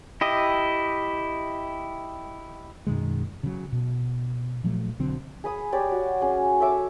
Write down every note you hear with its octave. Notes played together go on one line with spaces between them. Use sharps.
E4 G4 D#5
F#2 B2 D#3 G#3
C#3 F#3
B2
A#2 F3 F#3 A3
B1 D3 F#3 C4
G#4 B5 D#6
G4 C#5 D5
F#4
C#4 G#4
A4 C#5 E5 D6